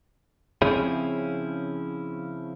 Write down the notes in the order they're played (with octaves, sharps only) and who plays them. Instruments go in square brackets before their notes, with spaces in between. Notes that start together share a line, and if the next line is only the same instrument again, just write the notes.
[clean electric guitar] C#3 F3 C4 C#4 E4 G#4